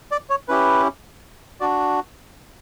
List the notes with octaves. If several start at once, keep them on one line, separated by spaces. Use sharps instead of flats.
D5
C#5
C#4 E4 G4 B4
D4 F#4 D5